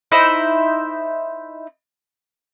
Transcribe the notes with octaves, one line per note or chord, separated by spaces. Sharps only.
D#4 E4 C5